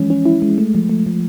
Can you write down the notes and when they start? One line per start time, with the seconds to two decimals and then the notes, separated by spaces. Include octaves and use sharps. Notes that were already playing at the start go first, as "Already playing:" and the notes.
Already playing: E3 F3 G#3 C#4
0.10 C#4
0.26 E4
0.42 G#3
0.58 A3
0.75 F3
0.89 A3
1.06 F3